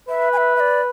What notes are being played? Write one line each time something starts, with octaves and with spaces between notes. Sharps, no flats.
B4 E5
G#5
E5
E5
D5